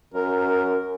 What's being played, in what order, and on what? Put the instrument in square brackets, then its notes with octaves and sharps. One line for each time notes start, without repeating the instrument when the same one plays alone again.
[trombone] F#2 [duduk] A#4